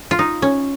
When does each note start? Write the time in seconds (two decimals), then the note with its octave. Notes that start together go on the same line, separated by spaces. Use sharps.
0.11 F4
0.19 D#4
0.42 C#4